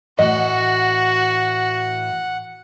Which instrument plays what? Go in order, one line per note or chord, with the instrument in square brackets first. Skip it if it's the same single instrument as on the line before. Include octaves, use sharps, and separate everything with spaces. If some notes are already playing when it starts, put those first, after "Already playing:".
[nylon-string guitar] A2 E3 [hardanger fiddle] F#4 [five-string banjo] D#5 [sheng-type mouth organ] F#5